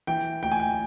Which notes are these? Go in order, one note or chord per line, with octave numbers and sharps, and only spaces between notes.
E3 G5
D2 G5
G#5
G5